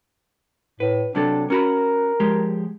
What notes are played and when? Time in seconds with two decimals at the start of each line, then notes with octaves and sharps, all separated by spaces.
0.80 A2 B4
1.15 C3 F#3 D4 A4
1.50 C#4 F#4 A#4 B5
2.20 F3 G#3 G4